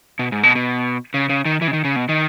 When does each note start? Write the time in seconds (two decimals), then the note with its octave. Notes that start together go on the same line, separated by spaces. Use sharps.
0.19 B2
0.32 G#2
0.43 B2
0.55 B2
1.14 C#3
1.29 C#3
1.45 D#3
1.62 E3
1.68 C#3
1.73 D#3
1.85 C#3
1.96 B2
2.09 D#3